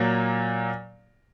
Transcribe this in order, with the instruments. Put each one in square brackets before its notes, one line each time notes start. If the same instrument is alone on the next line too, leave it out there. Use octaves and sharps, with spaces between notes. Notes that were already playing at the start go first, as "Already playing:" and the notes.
Already playing: [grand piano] A#2 F#3 A#3